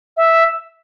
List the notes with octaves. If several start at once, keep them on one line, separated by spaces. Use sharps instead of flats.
E5